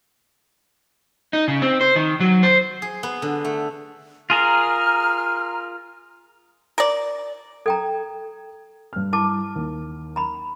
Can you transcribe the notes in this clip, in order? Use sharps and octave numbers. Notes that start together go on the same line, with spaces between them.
D#4
C#3
C4
C5
D#3
F#3
C5
G#4
B3
D3
A3
F4 G#4 A#4 A#5 F6
A#4 D5
A4 G5 A#5 G#6
G2 F6
E4 A5 D6
D#2
A#5 B5